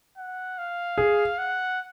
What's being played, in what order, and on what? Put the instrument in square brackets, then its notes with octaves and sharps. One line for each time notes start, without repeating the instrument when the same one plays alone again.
[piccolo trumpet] F#5
F5
[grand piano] G#4
[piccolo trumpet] F#5